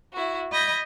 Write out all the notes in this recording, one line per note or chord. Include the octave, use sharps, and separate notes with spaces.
E4 F#4
D#5 B5 G6 G#6 A#6